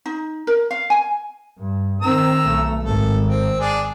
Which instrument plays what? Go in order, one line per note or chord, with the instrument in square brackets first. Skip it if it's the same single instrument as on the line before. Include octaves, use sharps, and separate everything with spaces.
[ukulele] D#4
A#4
F5
G#5
[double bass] G2
[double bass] D#3 C4 [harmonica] A#5 E6
[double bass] B1 A3
[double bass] G#1 [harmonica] A4
[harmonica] C4
D4 G#4